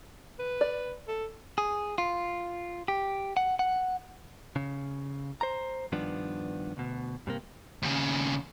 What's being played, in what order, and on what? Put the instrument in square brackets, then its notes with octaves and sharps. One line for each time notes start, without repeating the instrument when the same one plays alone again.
[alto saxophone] B4
[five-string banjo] D5
[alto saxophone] A4
[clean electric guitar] G#4
F4
G4
F#5
F#5
C#3
C5 A#5
G2 D#3 F3 B3 D4
D2 B2
G2 C3 A#3
[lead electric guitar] D#2 C#3